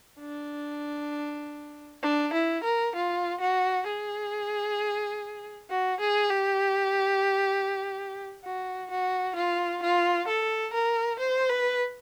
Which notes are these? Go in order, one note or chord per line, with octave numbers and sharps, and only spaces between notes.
D4
D4
E4
A#4
F4
F#4
G#4
F#4
G#4
G4
F#4
F#4
F4
F4
A4
A#4
C5
B4